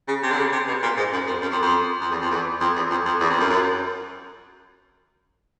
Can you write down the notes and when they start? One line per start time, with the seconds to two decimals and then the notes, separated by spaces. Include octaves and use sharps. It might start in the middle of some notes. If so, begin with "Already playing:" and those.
0.08 C#3
0.23 C3
0.31 D3
0.38 C#3
0.52 C3
0.67 B2
0.82 A#2
0.97 G#2
1.12 F#2
1.27 F2
1.42 F#2
1.52 F2
1.62 F2
2.01 F2
2.11 E2
2.21 F2
2.31 E2
2.61 F2
2.76 E2
2.91 F2
3.06 F2
3.20 E2
3.30 F2
3.40 F#2
3.50 F#2